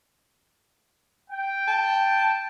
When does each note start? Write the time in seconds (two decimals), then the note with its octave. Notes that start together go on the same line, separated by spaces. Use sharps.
1.29 G5
1.68 A5